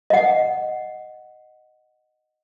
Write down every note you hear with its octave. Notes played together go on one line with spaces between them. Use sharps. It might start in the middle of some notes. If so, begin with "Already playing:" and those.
D#5 F#5